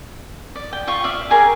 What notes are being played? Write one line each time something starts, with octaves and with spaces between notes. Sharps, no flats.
D5
G5
F4 C#6
D5 E5 F5
G4 G#4 A#4